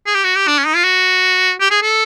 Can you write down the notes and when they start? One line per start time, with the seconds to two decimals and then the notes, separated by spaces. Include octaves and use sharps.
0.06 G#4
0.14 G4
0.24 F#4
0.36 G4
0.47 D4
0.58 C#4
0.66 D#4
0.76 F4
0.84 F#4
1.61 G4
1.71 G#4
1.83 A4